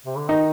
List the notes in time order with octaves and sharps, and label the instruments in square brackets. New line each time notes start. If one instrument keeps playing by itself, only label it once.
[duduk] C3
D3
[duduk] D#3 [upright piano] D#4